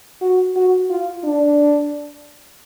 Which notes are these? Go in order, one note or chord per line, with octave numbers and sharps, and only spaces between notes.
F#4
F#4
F4
D4